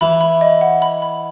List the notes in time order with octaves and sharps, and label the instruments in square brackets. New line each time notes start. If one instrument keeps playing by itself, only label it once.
[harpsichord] E3 [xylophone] B5
[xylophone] B5
D#5
F#5
B5
B5